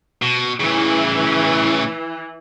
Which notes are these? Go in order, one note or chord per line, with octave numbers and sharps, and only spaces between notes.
B2
A2 C#3 E3